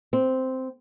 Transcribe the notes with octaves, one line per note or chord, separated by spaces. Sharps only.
C4